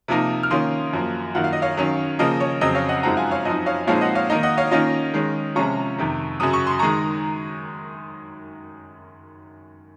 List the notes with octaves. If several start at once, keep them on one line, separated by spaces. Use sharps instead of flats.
C3 F3 A#3 D#4
F6
D#3 A#3 C#4 F4 C6 D#6
F#2 F3 A#3
F#2 D#3 A#3 F4 F#5
F5
D#5
C#5 F5
D#3 F#3 C#4
C#3 F3 A#3 D#5
C#5
F2 C#3 F#3 C4 D#5
C#5 F5
D#5 F#5
F#2 F3 G#3 C4 D#4 F#5 A#5
F5 G#5
C#5 F5
F#2 F3 C4 D#4 D#5
C#5 F5
A#2 F3 G#3 C4 D#4 C#5 F5
D#5 F#5
C#5 F5
D#3 A#3 D#4 D#5
D#5 F#5
C#5 F5
D#3 A#3 C#4 F4 D#5
D#3 G#3 C#4
C3 F3 G#3 C#4 F4 A#5 C#6
F2 C3 D#3
F#2 C#3 F#3 D#6
C#6
C6
D#3 G#3 D#4 A#5 C#6